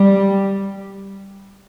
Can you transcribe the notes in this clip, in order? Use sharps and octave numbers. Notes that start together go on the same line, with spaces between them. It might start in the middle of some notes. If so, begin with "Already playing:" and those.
Already playing: G3